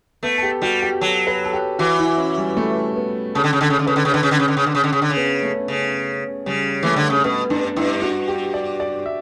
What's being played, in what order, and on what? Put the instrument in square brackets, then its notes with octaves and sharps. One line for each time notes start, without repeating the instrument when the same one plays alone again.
[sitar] A3 [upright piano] B3
[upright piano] A4
G4
[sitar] G3 [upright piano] F#4
[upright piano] G4
[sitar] F#3 [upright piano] A4
[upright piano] B4
A4
G4
[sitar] E3 [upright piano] F#4
[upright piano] E4
C#4
G3
A3
B3
[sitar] C#3 [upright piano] A4
[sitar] D3
C#3
[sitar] D3 [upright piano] A4
[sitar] C#3
D3
[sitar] C#3 [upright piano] B4
[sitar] D3
C#3
[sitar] D3 [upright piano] B4
[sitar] C#3
D3
C#3
D3
C#3
D3
C#3
D3
C#3
D3
C#3
[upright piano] B3
A3
[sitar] C#3
[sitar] C#3 [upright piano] G3
[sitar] E3 [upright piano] A3
[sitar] D3
C#3
[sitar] B2 [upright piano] B3
[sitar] G2 [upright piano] D4
[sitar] G2 [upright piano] E4
[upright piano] F#4
G4
D5
D5
E5